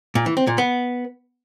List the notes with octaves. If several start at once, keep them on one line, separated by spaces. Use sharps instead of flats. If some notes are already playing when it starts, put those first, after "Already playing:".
A#2
E3
C4
A#2
B3